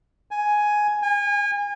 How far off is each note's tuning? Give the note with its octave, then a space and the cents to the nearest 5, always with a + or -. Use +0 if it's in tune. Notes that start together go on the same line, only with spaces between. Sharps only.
G#5 +5
G#5 -35